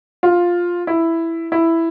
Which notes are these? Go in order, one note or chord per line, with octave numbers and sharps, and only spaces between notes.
F4
E4
E4